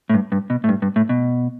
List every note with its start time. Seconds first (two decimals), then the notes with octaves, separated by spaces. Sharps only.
0.09 A2
0.14 G2
0.32 G2
0.50 B2
0.64 A2
0.69 G2
0.82 G2
0.96 A2
1.09 B2